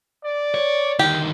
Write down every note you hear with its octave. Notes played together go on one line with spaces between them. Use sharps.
D5
C#5
D2 D#3 G4